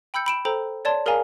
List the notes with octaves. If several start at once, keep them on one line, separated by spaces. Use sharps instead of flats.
G5 B5 E6 G6 C#7
B5 D7 E7
A4 C5 G5 A#5
C#5 D5 A5 C6
G#4 A#4 D5 F5 G#5 A#5